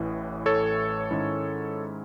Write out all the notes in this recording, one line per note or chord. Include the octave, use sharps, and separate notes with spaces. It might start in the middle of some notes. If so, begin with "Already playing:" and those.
Already playing: A1 A2 E3
A4 C#5
G#2 D#3 G#3 C#4 E4